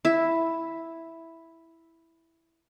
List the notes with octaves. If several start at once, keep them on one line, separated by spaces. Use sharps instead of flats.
E4 E5